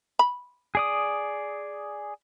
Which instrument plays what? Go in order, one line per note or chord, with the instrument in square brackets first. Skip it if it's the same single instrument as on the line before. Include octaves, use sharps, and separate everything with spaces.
[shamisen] B5
[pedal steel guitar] G#4 D5 D#6